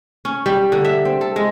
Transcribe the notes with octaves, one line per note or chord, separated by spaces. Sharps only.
C#4
G3
D3
E5
C4
A4
G#3